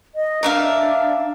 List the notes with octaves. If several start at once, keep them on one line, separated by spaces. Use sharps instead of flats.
D#5
D4 A#4 E5 F5